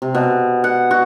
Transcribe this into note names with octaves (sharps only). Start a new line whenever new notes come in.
C3
B2
F#5
F#4